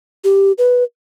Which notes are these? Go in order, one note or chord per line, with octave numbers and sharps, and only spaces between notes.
G4
B4